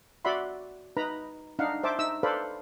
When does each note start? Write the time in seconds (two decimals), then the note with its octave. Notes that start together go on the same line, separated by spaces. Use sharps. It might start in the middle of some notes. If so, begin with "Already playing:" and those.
0.25 F#4 D5 E5 F#5 B5 C6
0.97 D#4 B4 A#5 B5
1.59 D4 D#4 F5 F#5
1.83 C5 E5 A5 D6
1.99 D#4 E5 E6
2.23 A4 B4 C5 D5 F5 B5